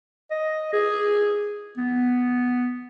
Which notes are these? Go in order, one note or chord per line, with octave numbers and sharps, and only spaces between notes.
D#5
G#4
B3